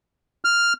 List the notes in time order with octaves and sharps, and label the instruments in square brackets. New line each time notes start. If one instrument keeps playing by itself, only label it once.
[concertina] F6